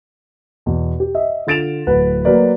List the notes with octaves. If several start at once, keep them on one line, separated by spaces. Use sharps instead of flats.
E2 B2
G4
D#5 E5
D3 F4 A6 D7 E7 F7
D1 B4 F#5
F#3 A#3 A#4 B4 D5